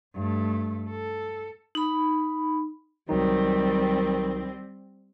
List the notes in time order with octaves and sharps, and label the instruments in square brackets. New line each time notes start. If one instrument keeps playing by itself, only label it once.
[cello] G2 A3
A4
[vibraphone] D#4 B5
[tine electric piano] C2 F#3 D#4 [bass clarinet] D#3 [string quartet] G3 C4